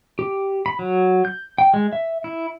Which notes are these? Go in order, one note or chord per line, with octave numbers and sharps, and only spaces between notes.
G4
B5
F#3
G6
G5
G#3
E5
E4